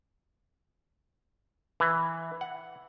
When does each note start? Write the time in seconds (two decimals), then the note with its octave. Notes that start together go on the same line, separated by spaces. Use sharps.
1.80 E3
2.41 F#5